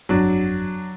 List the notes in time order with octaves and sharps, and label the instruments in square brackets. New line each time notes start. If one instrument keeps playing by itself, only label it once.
[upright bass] G1 F2 [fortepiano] F#3 D4